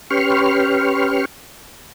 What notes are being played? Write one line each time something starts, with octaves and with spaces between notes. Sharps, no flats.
C#4 G4 B4 C6 C#6 F6